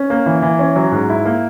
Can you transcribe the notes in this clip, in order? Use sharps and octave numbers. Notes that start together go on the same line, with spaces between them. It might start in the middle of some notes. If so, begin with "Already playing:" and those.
Already playing: C#4
A#3
E3
E3
C#4
F#3
G#2
E4
A#3